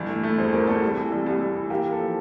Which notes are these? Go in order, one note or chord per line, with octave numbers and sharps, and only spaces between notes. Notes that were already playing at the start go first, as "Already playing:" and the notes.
Already playing: G1 E3
A3
A3
E2 C5
E2 A#4
E2 A4
C2
E3
C2
C2
C2
E3
A#3 G4
A#3
A4
F3